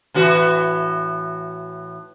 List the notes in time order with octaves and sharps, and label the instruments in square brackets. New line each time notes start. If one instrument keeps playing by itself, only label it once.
[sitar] A2 E3 F#4